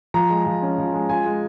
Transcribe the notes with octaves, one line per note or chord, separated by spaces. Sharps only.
F3 A#5
G#3
F3
C#4
F3
G#3
F4 G#5
G#3